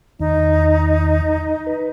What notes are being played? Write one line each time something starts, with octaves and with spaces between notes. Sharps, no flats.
E2 D#3 D#4
B4